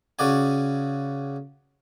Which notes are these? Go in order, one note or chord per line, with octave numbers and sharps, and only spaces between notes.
C#3 F#4 D5 G#5